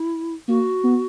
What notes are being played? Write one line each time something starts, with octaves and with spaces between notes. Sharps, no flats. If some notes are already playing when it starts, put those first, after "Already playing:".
Already playing: E4
A#3 F#4
B3